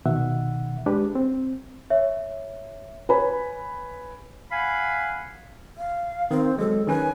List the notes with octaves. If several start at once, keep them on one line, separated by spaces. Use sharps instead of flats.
C2 B2 D#3 E5 F#5
G#3 D4 G4 B4
C4
C#5 E5
B4 C#5 G#5 B5
F5 F#5 G#5 B5
F5
D#3 C4
F#3 G#3 A4
D#3 C#4 B4 G#5